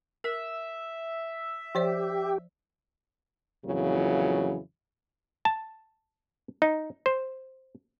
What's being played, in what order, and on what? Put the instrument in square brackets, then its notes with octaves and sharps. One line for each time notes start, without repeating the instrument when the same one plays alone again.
[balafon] A#4 [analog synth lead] E5
[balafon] F3 C5 D5 [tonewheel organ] G4
[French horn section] F2 A#2 C#3 E3 F#3
[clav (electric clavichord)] A5
D#4
C5